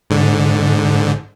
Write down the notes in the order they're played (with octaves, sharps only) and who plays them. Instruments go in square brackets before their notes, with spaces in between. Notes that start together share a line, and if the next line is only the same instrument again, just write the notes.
[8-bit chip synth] G#2 D3